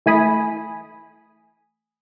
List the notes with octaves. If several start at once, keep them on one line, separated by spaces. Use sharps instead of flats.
E3 A3 G#5 B5 D#6